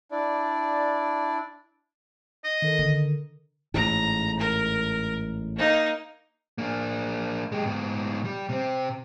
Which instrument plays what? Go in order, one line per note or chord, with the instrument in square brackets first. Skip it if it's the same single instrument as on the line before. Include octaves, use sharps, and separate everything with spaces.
[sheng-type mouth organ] D4 E4 D5
[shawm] D#5
[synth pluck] D#3 A4 A#4
[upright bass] D3
[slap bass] A1 G#2 [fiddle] A#5
[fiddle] A#4
A#3 D#4
[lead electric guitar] A#3 D4
G#3 G4
G#2 B3
G3
C3 C4